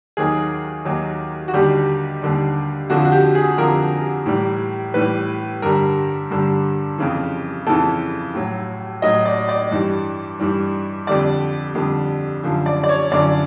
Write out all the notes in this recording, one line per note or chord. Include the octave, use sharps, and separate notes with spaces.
D#2 D#3 F#3 G#4
D#2 D#3 F#3
F#4
D#2 D3 G3 G4
D#2 D3 G3
F2 D3 F3 F#4
F#4
G4
G#4
F2 D3 F3 A#4
A2 E3 G3
A2 E3 G3 B4
G2 D3 G3 A#4
G2 D3 G3
F2 C#3 E3
F2 C#3 E3 A4
A2 F#3
A2 F#3 D#5
D5
D5
G2 E3 G3
G2 E3 G3
F2 D3 G3 D5
F2 D3 G3
F#2 D3 F3
D5
D5
C#5
F#2 D3 F3 D5